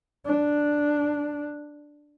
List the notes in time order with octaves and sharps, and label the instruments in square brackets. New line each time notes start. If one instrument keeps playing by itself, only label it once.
[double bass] D4